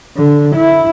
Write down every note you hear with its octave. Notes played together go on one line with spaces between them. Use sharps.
D3
E4